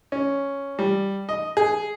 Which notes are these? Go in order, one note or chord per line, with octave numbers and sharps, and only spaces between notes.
C#4
G3
D#5
G#4